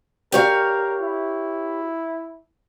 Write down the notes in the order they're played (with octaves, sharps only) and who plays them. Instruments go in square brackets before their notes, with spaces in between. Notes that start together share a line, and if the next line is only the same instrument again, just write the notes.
[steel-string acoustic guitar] G4 C#5 F5 [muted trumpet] A#4
[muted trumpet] E4